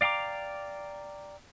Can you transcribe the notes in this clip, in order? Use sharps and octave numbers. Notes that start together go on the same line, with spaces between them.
D5 F5 G5 A#5 D6